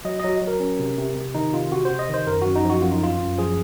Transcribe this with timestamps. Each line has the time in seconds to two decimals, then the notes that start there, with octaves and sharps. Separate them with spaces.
0.05 F#3 D#5
0.19 F#3 D#5
0.42 F#3
0.47 A#4
0.60 C#4
0.79 C3
0.98 C3
1.16 C3
1.35 D#3 D#4
1.53 C3 F4
1.71 C3 F#4
1.85 C5
1.91 C3
1.99 D#5
2.09 D#3 C5
2.27 F#2 A#4
2.42 F#2 F#4
2.56 D#4
2.65 F3
2.70 F#4
2.81 F#2 F4
2.92 D#4
3.02 F#2 F4
3.20 F#2
3.38 F3 G#4